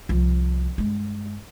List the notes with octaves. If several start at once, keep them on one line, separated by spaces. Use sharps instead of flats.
C2 F3
G2 G#3